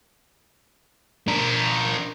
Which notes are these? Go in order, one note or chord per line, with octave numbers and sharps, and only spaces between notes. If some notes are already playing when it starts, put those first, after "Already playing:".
D4 A#4